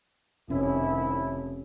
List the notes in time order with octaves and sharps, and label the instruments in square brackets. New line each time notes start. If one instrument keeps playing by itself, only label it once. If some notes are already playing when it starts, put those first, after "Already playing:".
[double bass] F1 [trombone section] C2 D#3 E4 [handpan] C#4